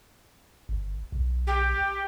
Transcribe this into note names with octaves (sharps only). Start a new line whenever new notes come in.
G1
B1
G4